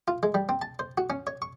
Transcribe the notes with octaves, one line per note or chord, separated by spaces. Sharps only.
F4
G#3
G3
C4
A5
C5
F#4
C#4
C#5
C#6